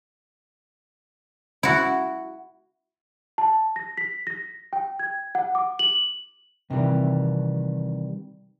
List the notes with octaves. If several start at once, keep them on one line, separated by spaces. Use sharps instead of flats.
E4 F#4
A5
A#6
B6
A#6
G5
G#6
F#5
D6
F#7
C3 D#3 E3 G3